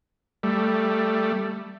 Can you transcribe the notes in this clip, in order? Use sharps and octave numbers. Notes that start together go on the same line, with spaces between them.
G3 A3